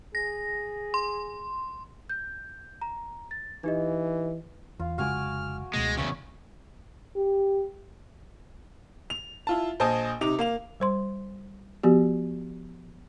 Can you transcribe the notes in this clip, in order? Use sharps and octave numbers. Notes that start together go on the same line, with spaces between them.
G#4 A#6
C6
G6
A#5
A6
E3 D#4 G4 D#5
E2 F4
F1 C#3 G#3 F#4 G#5 D6 F6
C#2 B2 G#3 A3 A#6
E2 C#3 C#5 E5
G4
F7
E4 F4 A5
A#1 C5 D#5 G#5 A5 D#6
C3 D#4 D6 F7
A#3 F5 F7
G3 C5 C6
F3 B3 F#4 G4